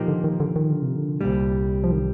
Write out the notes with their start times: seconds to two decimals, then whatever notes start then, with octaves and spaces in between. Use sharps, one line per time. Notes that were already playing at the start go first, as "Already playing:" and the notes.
Already playing: A#2 F3 A#3 D#4 G4
0.08 D3
0.24 D#3
0.40 D3
0.56 D#3
0.70 D3
0.82 C3
0.96 D3
1.21 C2 A#2 G3
1.84 F3
1.92 D#3